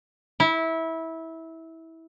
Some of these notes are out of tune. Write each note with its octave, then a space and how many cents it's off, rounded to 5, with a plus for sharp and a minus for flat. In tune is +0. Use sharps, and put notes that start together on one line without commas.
E4 -20